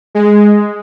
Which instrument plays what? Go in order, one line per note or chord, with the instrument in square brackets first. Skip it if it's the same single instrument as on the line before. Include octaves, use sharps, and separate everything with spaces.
[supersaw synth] G#3